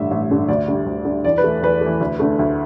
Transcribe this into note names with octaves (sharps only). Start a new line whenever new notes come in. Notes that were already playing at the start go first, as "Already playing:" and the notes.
Already playing: A1 G2 D3 E5
A1
G2 D3
D2 D5
D3 G3
D2
D3 G3
E2 D5
B4
E3 A3
E2 B4
E3 A3
D2
D3 A3
D2